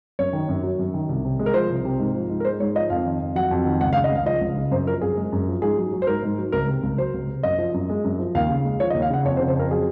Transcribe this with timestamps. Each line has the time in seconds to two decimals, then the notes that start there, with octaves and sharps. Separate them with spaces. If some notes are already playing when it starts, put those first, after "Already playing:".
0.19 F#2 C#5
0.33 D#3
0.49 F#2
0.63 F#3
0.79 F#2
0.94 D#3
1.09 C2
1.25 C3
1.39 G#3
1.46 A#4
1.54 F3 C5
1.69 C2
1.85 C3
1.99 G#2
2.14 F3
2.30 G#2
2.40 A#4
2.45 G#3 C5
2.60 G#2 C#5
2.75 F3 D#5
2.90 F2 F5
3.05 D#3
3.20 F2
3.35 F#3 F#5
3.51 F2
3.66 D#3
3.81 C#2 F#5
3.93 F5
3.96 C#3
4.04 D#5
4.11 C#2 F5
4.26 F3 D#5
4.41 C#2
4.57 C#3
4.71 F#2 C5
4.86 F3 A#4
5.02 F#2 G#4
5.17 G#3
5.32 F#2
5.48 F3
5.62 G#2 G#4
5.77 F#3
5.93 F#3
6.02 C5
6.07 G#2 A#4
6.23 G#2
6.38 F#3
6.52 C#2 A#4
6.69 C3
6.83 C#2
6.98 F#3 C5
7.14 C#2
7.28 C3
7.43 F#2 D#5
7.58 F3
7.74 F#2
7.89 G#3
8.04 F#2
8.19 F3
8.35 D#2 F5
8.50 C#3
8.65 G#3
8.80 F3 C#5
8.90 D#5
8.94 D#2
9.02 F5
9.10 C#3 F#5
9.24 F2 C#5
9.37 C5
9.40 C#3
9.48 C5
9.56 F2 A#4
9.70 F#3 G#4